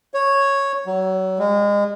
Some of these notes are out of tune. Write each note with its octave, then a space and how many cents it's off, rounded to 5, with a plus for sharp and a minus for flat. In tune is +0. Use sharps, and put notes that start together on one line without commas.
C#5 -5
F#3 +30
G#3 -30